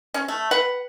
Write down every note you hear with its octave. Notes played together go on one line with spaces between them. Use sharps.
C#4
A3
B4 F#5